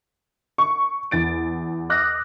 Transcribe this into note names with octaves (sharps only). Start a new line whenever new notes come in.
C#6
E2 A6 D7
D6 D#6 F6 F#6 A#6